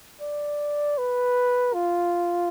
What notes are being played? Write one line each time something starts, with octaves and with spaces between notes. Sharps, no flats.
D5
B4
F4